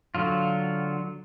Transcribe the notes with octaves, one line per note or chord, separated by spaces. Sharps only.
D3 F#3 F4